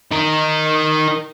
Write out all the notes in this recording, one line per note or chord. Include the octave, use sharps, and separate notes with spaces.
D#4 A#4